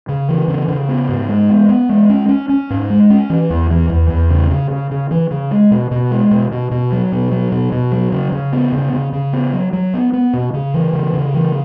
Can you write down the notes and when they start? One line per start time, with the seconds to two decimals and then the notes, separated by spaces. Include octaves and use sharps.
0.09 C#3
0.29 E3
0.48 C#3
0.68 C#3
0.89 B3
1.09 G#2
1.29 G#3
1.49 B3
1.69 B3
1.89 G#3
2.10 C#4
2.29 C#4
2.49 C#4
2.70 G#2
2.90 G#3
3.10 C#4
3.30 E3
3.50 E2
3.70 E3
3.90 E2
4.10 E2
4.30 C#3
4.51 C#3
4.71 C#3
4.91 C#3
5.11 E3
5.31 C#3
5.51 G#3
5.71 B2
5.91 B2
6.11 G#3
6.31 B2
6.52 B2
6.71 B2
6.92 F#3
7.12 B2
7.32 F#3
7.52 B2
7.72 B2
7.92 F#3
8.12 C#3
8.32 C#3
8.53 B3
8.72 C#3
8.93 C#3
9.13 C#3
9.33 B3
9.53 F#3
9.73 F#3
9.94 B3
10.13 B3
10.33 B2
10.54 C#3
10.74 E3
10.93 C#3
11.14 C#3
11.34 E3